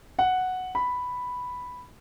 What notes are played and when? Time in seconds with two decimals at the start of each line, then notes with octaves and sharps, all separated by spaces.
0.19 F#5
0.75 B5